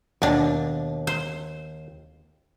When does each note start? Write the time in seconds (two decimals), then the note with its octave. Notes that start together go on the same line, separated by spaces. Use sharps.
0.22 D#2 B2 D4
1.07 C5